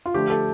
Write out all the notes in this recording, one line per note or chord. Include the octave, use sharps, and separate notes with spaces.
F4
D3 F3 A3 G4
A4